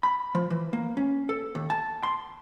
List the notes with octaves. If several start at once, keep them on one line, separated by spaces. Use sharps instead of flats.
B5
F3
E3
A#3
C#4
A4
D#2
A5
C6